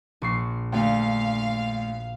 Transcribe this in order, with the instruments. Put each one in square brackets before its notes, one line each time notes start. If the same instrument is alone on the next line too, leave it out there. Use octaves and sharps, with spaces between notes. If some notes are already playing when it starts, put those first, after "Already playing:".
[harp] A#1 C#6 C7
[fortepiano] D2 [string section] F5